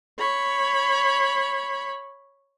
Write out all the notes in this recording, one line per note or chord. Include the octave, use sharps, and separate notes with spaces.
C#5 B5